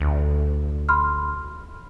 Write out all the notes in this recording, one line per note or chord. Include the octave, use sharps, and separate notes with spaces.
D2
B5 C6 F6